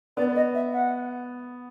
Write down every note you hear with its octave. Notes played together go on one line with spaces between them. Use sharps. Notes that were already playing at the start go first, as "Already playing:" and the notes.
B3 D5
D#5
E5
F#5